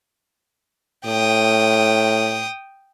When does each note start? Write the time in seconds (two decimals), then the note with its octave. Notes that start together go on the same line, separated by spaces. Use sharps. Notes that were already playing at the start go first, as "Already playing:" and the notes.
1.06 A2 G5 D#6